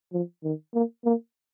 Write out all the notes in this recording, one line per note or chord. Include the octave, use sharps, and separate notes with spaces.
F3
D#3
A#3
A#3